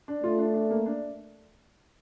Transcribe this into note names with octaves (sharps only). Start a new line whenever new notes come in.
D4
A3 F4
D4
D4
A#3
D4